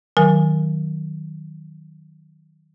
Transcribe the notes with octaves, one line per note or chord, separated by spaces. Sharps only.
D#3 F#3 A#4 G#5